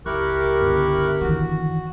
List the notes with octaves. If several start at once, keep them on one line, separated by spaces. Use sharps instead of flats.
C#2 E4 G4 A#4 C#6 F#6
G1
D#3 E3 F#4